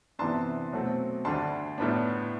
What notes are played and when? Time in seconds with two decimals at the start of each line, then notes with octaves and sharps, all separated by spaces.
0.19 C3 E3 B3 D4 A5 C6
0.72 B2 F#3 A3 C4
1.25 D2 D3 G3 D4 A5 C6
1.78 A2 G3 B3 D4